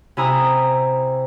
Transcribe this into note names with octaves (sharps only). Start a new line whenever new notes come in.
C3 E4 G#5 A#5 D#6